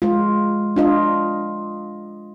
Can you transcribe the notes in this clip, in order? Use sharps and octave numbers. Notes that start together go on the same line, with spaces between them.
G#3 F4
D4 F4 D#5